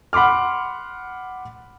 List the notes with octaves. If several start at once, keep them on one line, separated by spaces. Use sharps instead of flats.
F#5 B5 C6 D6 F6